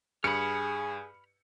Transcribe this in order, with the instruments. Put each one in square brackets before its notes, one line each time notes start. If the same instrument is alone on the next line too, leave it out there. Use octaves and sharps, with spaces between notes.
[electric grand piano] G2 [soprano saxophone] G#4 [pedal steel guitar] B5 F6 [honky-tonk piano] C#7